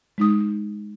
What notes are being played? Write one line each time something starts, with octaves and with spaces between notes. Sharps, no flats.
G#3 D#4 D#6